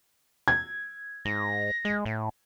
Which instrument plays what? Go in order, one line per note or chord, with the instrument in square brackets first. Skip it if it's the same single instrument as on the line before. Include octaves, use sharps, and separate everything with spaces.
[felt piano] G#6
[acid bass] G#2 [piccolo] A#6
[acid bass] G#3
A2